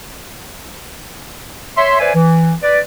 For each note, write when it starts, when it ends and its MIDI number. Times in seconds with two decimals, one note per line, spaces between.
1.78 1.98 73
1.78 1.98 76
1.78 1.98 84
2.00 2.14 71
2.00 2.14 72
2.00 2.14 74
2.00 2.14 76
2.00 2.14 80
2.15 2.53 52
2.63 2.80 71
2.63 2.80 74